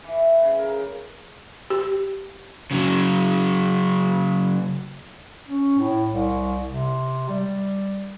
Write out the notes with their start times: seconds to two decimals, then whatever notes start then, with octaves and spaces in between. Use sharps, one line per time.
0.04 E3
0.43 C#3
0.59 A#4
1.70 G4
2.71 C#3 F#3
5.48 C#4
5.78 A2
6.12 C2
6.68 C3
7.29 G3